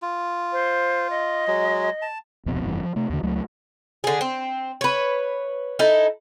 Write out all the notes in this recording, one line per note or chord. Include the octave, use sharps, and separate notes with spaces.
F4
C5
D#5
F#3 G#3
A5
D1 C2 F2 B2
F1 G2 E3
F3
C3 A3
D#2 D3
C#2 F#3 A3
D3 G#4
C4
B4 C#5
D#4 E4 A4